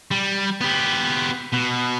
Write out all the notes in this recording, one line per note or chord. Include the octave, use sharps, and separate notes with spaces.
G3
B3 G4
B2